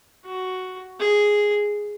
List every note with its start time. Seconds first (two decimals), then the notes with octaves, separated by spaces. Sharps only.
0.25 F#4
1.00 G#4